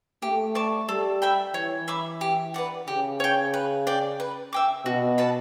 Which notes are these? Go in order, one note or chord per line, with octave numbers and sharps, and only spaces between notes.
A3 G4
D5 A5 C#6
G3 A4
E5 G5 B5
E3 C#5
E5 B5 D6
G4
B4 D5 F#5
C#3 G4
C#5 G5
B4
D5 G5
B4
E5 G5 D6
B2 F#4
B4 F#5 A5